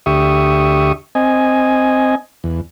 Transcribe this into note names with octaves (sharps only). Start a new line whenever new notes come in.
D2 G4 E5 C#6 D#6
C4 D#5 G#5
E2